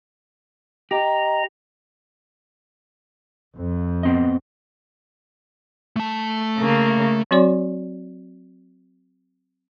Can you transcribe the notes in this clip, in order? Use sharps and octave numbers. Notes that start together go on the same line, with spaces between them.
G4 D#5 A#5
F2
B3 C4 D#5
A3 A5
C#3 A#3
F#3 C4 F#4 C#5 D5 C6